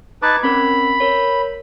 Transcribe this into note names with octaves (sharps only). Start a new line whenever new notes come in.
D#4 B4 A5 D6 G#6
C4 C#4 A#4 B5
A#4 C#5